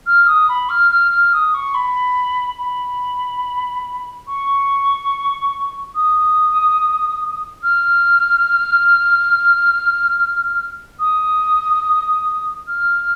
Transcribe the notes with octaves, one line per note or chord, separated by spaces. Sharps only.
F6
D#6
B5
F6
F6
F6
D#6
C#6
B5
B5
C#6
D#6
F6
D#6
F6